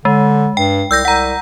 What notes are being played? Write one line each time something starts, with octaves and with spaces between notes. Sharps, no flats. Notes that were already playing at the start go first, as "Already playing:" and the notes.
D3 G#3
G2 G5
C2 E6 G6 A#6
C2 F#5 A#5